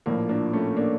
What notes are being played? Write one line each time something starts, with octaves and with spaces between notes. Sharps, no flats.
A#1 A2 F3 A#3
A#3 D4
A3 C#4
A#3 D4